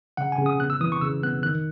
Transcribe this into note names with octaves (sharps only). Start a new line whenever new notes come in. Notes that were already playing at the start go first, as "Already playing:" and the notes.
C#3 F#5
G#5
C#3
D#6
B3 F#6
E6
E3 D#6
C#6
C#3 E6
B3 F#6
D#3 F#6